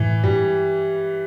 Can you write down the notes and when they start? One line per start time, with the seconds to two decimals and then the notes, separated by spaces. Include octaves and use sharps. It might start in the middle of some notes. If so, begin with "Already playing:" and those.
Already playing: A2 E3
0.24 G2 G3